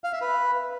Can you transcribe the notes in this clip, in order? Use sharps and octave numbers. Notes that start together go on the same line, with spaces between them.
F5
E5
B4